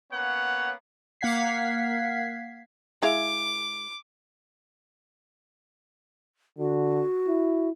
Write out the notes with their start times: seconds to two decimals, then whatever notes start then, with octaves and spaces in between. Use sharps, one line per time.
0.12 A#3 B3 C#4 C#5 F#5
1.21 A#3 F5 F#5 G#6 B6 C7
3.03 G#3 E4 F5 D6
6.58 D3 F#4
7.28 E4